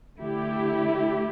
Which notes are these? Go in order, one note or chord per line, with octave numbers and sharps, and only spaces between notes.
D3 A3 E4 G4